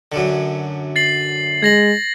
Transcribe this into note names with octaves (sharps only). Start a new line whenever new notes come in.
F#2 D3
A6 C7 F#7
G#3 G#6 A#6 F#7